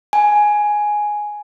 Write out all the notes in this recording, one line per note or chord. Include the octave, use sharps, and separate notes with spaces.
G#5